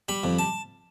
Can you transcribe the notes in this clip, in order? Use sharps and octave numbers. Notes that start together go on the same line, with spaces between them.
G3 B5
F2
A5